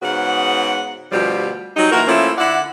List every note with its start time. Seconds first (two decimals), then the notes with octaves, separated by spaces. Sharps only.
0.03 G#2 C#3 B3 F#4 F#5
1.12 D2 B2 F3 G3 G4
1.77 F#3 G3 D#4
1.92 A#2 E3 F#4 A#4
2.08 F3 A3 A#3 C#4 E4
2.38 D3 E4 D5 F#5